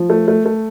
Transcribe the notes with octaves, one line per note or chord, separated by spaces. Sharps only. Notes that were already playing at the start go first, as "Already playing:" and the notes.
Already playing: F3
A3
A3
A3